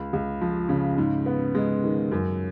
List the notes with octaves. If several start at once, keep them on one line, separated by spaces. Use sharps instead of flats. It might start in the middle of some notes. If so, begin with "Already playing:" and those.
Already playing: C#2
C#2
F3
C#3
G#2
B3
G#3
D#3
F#2